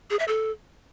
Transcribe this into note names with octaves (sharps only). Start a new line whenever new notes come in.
G#4
E5
A4